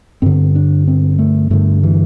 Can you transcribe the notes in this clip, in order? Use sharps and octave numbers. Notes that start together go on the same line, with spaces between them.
G2 D3 C4
D4
C4
A3
G2 D3 A3
E3